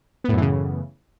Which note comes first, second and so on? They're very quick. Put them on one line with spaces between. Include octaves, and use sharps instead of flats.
B3 A2 F#2 E3 C#3